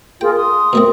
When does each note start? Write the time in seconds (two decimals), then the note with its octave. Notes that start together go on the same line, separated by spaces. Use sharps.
0.21 F4 G#4 A#4 G5
0.34 C6 D#6
0.73 B2 A3 C4 A#4